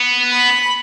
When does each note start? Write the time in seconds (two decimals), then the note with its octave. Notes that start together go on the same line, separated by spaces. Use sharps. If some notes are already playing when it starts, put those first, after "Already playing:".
Already playing: B3
0.30 B5